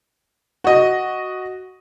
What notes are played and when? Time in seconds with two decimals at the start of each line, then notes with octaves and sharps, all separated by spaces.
0.64 F#4 D#5